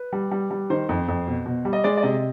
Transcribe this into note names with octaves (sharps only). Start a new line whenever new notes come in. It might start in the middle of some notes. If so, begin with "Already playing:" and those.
Already playing: B4
G3
G3
G3
D#3 C5
F2
F2
B2
B2
G3
D#5
G#3 D5
D5
C3 D#5